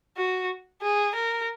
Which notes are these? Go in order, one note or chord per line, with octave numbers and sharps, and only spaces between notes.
F#4
G#4
A#4